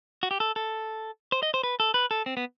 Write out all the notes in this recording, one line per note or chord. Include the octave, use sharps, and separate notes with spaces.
F#4
G4
A4
A4
C5
D#5
C5
B4
A4
B4
A4
C4
B3